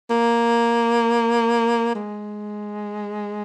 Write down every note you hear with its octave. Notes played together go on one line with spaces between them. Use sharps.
A#3
G#3